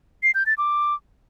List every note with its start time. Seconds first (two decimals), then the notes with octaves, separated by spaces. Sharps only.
0.23 C7
0.35 G6
0.46 A6
0.58 D6